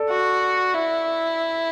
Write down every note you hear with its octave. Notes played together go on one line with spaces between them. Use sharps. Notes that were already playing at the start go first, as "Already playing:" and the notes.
Already playing: A4 D5
F#4
E4